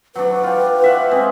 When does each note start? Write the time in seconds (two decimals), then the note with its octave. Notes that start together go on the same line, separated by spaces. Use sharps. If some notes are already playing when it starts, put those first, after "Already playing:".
0.16 F#3 D4 B4
0.43 F4 G4
0.82 F4 E5 F#5
1.11 G#3 C4